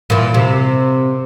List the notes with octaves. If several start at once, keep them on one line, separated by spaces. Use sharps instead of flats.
A#2 E3
C3